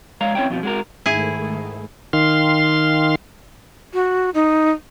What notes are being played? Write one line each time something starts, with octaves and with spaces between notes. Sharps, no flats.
G#3 C#5 F5 A#5
C4 C#4 E4 C#5 G5
F2 B2 F3
G#3 F#4 A#4
G#2 D#3 A3 E4 G#4
D#3 F5 C6
F#4
D#4